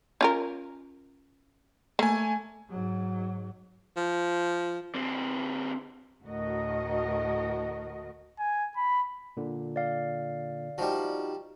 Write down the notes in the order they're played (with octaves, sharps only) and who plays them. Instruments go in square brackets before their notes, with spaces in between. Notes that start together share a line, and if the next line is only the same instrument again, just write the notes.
[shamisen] C#4 F4 A#4
[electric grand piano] A3 G#5 [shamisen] A#3
[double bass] G#2 F#3
[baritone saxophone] F3
[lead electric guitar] D3 C4
[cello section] D2 A2 F#4 A#4 D#5
[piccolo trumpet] G#5
B5
[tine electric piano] A#2 D3
[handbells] D5 F5
[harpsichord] F3 G3 [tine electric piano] D#4 F#4